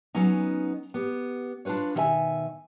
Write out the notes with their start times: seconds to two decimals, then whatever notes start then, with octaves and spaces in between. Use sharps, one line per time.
0.15 F#3 B3 C#4 D#4
0.94 B3 G4
1.65 D4 F4 F#4 B4 C#5
1.95 B2 D#3 F#4 B4 E5 G#5